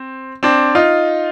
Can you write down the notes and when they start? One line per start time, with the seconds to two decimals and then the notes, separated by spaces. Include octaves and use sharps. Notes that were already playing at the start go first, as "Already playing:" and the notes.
Already playing: C4
0.43 C4 D4
0.75 D#4 F4